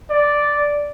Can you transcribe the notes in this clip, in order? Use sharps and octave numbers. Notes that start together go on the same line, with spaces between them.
D5